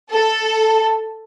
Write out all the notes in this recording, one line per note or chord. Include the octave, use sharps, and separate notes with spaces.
A4